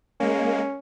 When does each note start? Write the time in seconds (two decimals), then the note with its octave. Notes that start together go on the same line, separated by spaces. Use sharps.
0.20 G#3 A#3 C#4